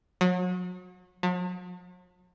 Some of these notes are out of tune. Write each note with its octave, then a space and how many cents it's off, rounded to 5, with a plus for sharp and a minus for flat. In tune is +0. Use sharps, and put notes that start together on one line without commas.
F#3 -35
F#3 -45